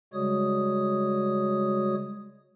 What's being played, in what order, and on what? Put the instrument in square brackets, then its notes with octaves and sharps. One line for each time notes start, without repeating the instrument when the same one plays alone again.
[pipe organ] C#3 G3 G#3 F#4 C#5 D#6